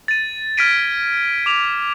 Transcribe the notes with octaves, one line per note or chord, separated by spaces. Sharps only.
A6 D#7
F6 G#6 A6 B6 D7 D#7
D6 F7